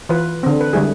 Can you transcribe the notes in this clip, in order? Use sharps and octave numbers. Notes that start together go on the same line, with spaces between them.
E3 F4 B4
D3 C4
B4
D3 G3 G#3 E4 G#4